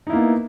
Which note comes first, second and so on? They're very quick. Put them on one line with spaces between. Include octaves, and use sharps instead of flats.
D#4 E4 A#3 B3